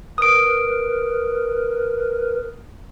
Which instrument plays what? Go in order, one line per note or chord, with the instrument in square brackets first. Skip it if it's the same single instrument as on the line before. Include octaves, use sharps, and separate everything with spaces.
[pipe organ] A#4 B4 [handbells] D#6 D7